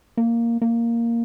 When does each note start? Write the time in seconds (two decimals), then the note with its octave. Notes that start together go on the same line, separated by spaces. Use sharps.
0.17 A#3
0.62 A#3